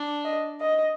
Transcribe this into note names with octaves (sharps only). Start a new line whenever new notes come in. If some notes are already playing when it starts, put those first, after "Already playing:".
Already playing: D4
D#5
D#5